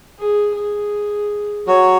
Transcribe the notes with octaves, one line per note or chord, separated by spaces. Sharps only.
G#4
G#4
F#3 F#4 C#5